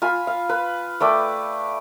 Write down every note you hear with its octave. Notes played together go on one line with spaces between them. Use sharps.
F4 G#5 B5
F5
B4
A3 B4 D5 G5